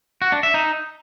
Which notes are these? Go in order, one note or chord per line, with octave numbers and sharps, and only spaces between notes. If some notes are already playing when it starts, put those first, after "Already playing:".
F#4
D4
E5
D#4